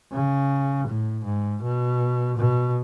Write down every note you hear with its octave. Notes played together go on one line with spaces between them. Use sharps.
C#3
A2
G#2
B2
B2